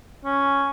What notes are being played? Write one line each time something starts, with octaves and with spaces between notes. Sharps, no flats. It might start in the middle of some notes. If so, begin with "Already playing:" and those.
C#4